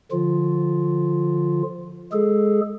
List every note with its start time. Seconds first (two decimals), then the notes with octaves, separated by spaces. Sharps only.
0.11 D3 F3 F4
2.13 G#3 G#4 A4